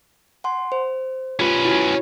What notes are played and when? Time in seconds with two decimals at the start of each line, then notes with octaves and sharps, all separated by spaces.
0.44 F#5 G#5 C6
0.72 C5
1.39 C#4 F4 G4 B4
1.65 E4 F#4